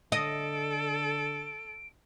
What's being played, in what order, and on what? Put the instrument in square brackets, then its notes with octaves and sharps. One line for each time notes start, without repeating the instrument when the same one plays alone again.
[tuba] D3 [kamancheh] A4 [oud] D#5 [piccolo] D7